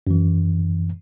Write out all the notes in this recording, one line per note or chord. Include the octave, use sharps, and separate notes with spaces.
F#2 E3